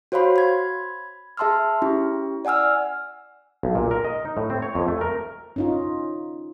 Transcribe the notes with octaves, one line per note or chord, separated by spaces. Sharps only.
F#4 C5 C#5 F5 B5 C6
B5 G#6
G#4 E5 A5 C6 E6 F6
C#4 E4 G4
D5 F#5 G#5 E6 F6
B1
A#2
A#4
D#5
D#4
A2
C4
C#5
F2
A3
A#4
C#4 D#4 F4